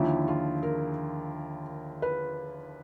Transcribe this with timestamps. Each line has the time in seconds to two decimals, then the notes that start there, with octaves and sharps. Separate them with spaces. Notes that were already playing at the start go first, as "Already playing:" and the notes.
Already playing: D#2 D3 F3 E4
0.28 F4
0.63 A#4
2.02 B4